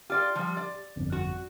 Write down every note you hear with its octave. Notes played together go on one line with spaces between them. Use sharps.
F4 G4 D5 C6
F3 G3
D5
G1 F2
F#4